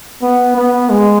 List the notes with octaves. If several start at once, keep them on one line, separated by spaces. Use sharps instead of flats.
B3
B3
G#3